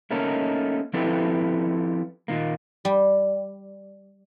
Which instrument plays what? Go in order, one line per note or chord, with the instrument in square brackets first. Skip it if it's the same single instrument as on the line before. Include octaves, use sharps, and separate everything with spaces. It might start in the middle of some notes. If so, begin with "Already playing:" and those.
[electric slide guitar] A3 A#3 C#4 D#4 A4 A#4
F3 C4 E4 G4 A4 B4
A#2 D#3 A#3
[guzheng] G3